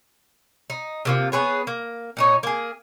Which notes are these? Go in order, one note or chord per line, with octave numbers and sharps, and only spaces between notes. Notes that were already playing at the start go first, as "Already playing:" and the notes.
D#4
C3 A#3 F4
B3 G#4 B4 C#5
A#3
A#2 D#4 C#5
A#3 G#4